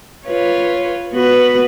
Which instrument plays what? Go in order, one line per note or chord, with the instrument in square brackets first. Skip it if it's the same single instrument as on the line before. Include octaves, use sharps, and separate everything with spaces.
[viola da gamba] F4 B4 C#5
B3 F#4 B4